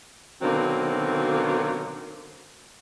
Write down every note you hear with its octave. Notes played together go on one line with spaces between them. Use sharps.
B2 D3 D#3 F#3 A#3 C4